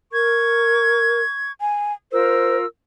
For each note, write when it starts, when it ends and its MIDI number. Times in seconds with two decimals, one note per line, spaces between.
0.13 1.22 70
0.13 1.52 85
0.13 1.52 92
1.61 1.93 80
2.12 2.66 65
2.12 2.66 70
2.12 2.56 72
2.12 2.66 88